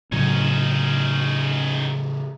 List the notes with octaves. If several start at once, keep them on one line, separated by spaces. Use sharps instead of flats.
A2 C#3 F#3 C#4 D#4